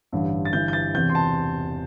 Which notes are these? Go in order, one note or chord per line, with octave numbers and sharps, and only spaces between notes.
A1 G2 D3
A6
G1 G2 E3 G6
G6
A6
E1 E2 C3 G6
C6
A5